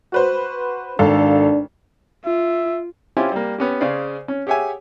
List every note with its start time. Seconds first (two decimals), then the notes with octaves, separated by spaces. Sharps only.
0.12 F#4 B4 C5
0.99 G#1 D4 A4 F5
2.24 F4 E5
3.17 C#4 E4 F4 G4 C5 G#5
3.32 G3 A#3
3.58 B3 C#4 G4
3.81 C#3 G#4 C5 D5 F5
4.28 C#4
4.47 G4 G#4 C#5 E5 F#5 G#5